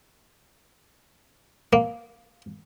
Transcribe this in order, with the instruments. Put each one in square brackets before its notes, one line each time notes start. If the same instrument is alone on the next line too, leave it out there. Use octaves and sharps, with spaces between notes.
[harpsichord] A#3